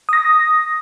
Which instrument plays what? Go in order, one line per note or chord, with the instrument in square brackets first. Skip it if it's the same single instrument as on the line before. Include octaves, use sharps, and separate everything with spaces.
[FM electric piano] D#6 A#6